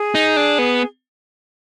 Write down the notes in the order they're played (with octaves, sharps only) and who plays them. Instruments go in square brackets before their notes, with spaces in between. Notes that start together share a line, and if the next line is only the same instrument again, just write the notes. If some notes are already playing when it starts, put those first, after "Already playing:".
Already playing: [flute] G#4
[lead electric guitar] D#4
D4
B3